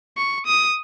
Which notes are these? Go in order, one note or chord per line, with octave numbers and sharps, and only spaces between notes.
C#6
D#6